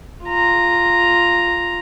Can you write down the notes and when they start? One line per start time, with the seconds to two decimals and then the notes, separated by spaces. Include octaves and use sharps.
0.25 F4 A#5